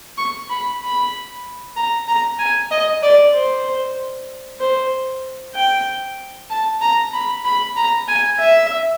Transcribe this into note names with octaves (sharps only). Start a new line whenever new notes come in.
C#6
B5
B5
A#5
A#5
G#5
D#5
D5
C5
C5
G5
A5
A#5
B5
B5
A#5
G#5
E5